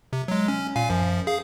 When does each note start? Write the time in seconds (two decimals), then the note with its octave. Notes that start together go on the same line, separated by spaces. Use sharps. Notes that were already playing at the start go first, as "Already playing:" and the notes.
0.13 C3
0.28 F#3 G#3
0.48 C#4
0.76 A#2 F5 G#5
0.90 F#2 F3
1.27 G#4 F5